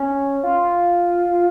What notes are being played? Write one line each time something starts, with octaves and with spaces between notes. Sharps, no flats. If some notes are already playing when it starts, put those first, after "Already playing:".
Already playing: C#4
F4